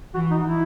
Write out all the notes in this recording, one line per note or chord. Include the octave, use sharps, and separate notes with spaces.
E3 F#4
D#4
E4